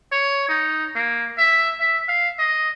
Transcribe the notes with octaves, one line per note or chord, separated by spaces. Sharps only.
C#5
D#4
A#3
E5
E5
F5
D#5